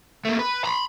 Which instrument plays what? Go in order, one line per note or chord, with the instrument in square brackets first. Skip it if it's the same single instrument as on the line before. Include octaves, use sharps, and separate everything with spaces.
[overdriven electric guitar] A3 A#3
B4
A#5 B5